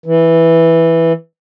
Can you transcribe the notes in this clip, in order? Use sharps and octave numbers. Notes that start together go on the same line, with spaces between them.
E3